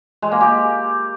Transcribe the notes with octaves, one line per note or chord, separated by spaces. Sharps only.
G#3
A#3
G4